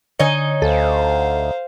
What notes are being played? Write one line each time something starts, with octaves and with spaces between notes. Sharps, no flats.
D3 D#4 C#5 D#5 G#5
D2 A4 C5 F5